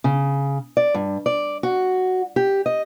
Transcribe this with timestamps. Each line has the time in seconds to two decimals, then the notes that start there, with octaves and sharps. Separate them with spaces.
0.04 C#3
0.77 D5
0.94 G2
1.26 D5
1.63 F#4
2.36 G4
2.66 D#5